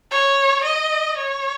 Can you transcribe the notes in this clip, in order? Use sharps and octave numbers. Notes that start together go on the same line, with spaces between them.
C#5
D#5
C#5